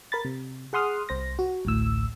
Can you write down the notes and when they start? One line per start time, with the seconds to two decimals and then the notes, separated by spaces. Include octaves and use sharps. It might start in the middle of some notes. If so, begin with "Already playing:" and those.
0.12 A#4 B5 A6
0.25 C3
0.73 G#4 F#5 C6 D#6 F6
1.09 C2 C5 A#6
1.39 F#4
1.65 A1 D2 A2 E6